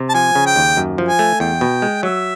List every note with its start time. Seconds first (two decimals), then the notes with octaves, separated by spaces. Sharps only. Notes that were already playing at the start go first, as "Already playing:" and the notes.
Already playing: C3
0.09 A5
0.14 F3 G#5
0.35 C#3
0.46 G5
0.56 D#2
0.77 F#2
0.98 F3
1.09 G#5
1.19 A3
1.40 E2 G5
1.61 B2
1.82 G#3
2.03 F#3 E5